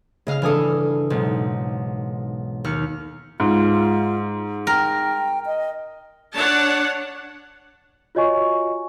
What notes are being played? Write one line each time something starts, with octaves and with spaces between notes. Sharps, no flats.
C#3 G#4 D#5 F5 F6
G2 E3 D4 A4 G#5 D#6
B1 G#2
D#2 F6 C#7
G#2 F4
A#4 G5
D#5
D4 C#5 F#5 A5
F4 F#4 C#5 D#5 G#5 C#6